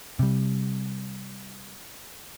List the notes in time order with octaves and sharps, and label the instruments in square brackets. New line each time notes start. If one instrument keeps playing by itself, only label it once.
[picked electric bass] C3 G3